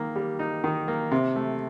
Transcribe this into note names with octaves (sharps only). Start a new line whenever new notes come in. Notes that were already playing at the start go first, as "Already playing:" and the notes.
Already playing: D#3 A#3
G3
D#4
D#3
A#3
C3
A3